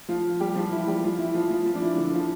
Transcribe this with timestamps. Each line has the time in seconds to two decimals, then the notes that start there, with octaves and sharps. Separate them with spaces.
0.08 F3 F4
0.40 G3 G4
0.55 F3 F4
0.71 E3 E4
0.87 G3 G4
1.03 F3 F4
1.18 E3 E4
1.34 F3 F4
1.50 F3 F4
1.66 F3 F4
1.75 D4
1.82 E3 E4
1.97 D3 D4
2.13 F3 F4